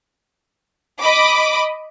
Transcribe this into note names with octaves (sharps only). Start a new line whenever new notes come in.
D#5 B5 D6